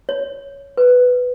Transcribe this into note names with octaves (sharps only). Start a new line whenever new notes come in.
C#5
B4